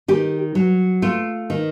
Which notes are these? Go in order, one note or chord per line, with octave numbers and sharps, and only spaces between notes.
D#3 G4
F#3
A3 F4
D#3